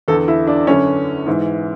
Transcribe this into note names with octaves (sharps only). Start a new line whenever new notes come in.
E2 D3 A4
E4
D4
F#2 D3 C#4
G#2 E3